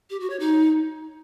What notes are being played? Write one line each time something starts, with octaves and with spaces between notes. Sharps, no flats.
G4
F#4
C#5
D#4